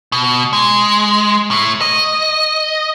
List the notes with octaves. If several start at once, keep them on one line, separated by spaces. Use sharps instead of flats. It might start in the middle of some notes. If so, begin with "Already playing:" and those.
B2
G#3
A2
D#5